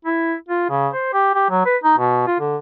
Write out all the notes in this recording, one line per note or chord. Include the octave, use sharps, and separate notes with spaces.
E4
F4
C#3
C5
G4
G4
F#3
B4
D#4
B2
F4
D3